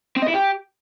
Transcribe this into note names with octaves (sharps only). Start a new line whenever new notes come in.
C4
D#5
E4
G4